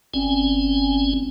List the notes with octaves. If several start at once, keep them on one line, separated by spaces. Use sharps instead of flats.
G1 C4 C#4 G#5